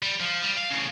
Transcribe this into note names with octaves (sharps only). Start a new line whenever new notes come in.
G3
F3
G3
F5
A2 C#3